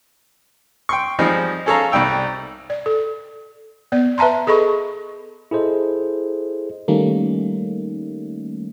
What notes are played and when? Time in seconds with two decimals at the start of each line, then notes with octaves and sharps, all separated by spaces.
0.89 G5 C6 C#6
1.19 F3 G3 G#3 C4 D#4
1.66 C#4 G#4 A4 C#5 F5 A#5
1.92 C2 G3 D#4 G5 E6
2.70 D5
2.86 A4
3.92 B3 D5
4.18 B4 E5 A5 A#5 C6
4.47 G#4 A4 D#5 B5 C#6
5.51 E4 G#4 A4 C5 D#5
6.88 D#3 G3 A3 A#3 C#4 D#4